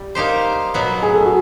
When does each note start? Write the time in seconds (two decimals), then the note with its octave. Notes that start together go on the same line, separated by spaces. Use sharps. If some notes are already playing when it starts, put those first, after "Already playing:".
Already playing: G3
0.15 A#3 D#4 G4 C5
0.74 B2 F#3 B3
1.02 G#4
1.14 A4
1.26 F#4 G#4